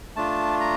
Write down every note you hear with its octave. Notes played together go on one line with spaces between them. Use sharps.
A3 D4 F4 A5
A#5